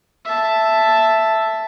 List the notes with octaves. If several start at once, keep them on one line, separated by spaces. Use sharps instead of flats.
E5 A5